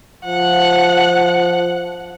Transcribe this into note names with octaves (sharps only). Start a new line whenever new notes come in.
F3 F#5